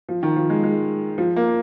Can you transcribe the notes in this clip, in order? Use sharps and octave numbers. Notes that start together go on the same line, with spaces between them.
F3
D#3
F3
G#3
G#3
F3
A#3